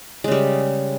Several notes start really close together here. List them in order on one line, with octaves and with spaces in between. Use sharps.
G#3 C#3 G3